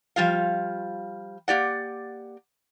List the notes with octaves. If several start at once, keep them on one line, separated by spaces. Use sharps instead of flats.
F3 G3 F4 F5
A#3 G4 D5 F#5